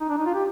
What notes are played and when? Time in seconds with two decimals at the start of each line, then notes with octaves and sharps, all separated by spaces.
0.01 D#4
0.09 D4
0.17 D#4
0.26 F4
0.34 G4